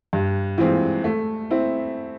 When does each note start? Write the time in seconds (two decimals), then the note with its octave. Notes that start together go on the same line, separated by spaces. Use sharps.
0.13 G2
0.58 E3 G#3 C4 F4
1.04 A3
1.51 C4 E4